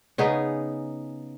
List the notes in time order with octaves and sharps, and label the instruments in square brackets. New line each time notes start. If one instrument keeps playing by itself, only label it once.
[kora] C#3 B3 D#4 G#4